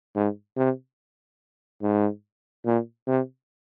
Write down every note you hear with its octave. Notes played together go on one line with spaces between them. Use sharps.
G#2
C3
G#2
A#2
C3